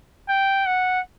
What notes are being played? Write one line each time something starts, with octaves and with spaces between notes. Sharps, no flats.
G5
F#5